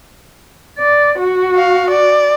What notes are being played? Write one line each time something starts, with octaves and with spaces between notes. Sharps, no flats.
D5
F#4
F5
D5